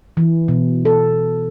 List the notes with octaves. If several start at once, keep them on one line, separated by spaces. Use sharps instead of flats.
E3
B2
A4